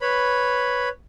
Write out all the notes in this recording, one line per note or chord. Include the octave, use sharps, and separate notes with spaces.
B4 C#5 B5